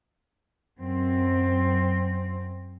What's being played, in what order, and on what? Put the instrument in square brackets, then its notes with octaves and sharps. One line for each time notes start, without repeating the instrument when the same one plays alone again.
[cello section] F#2 C4